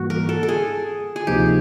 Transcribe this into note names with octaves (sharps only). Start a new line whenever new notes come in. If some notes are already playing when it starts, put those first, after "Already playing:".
Already playing: G#2 E3 G3 A#3 F#4
A#4
A4
A4
G#4
G#4
D2 C3 F3 A#3 D#4 G4